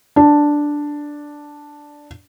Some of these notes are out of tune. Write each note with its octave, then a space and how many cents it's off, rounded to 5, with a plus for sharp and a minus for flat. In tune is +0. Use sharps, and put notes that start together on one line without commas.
D4 +0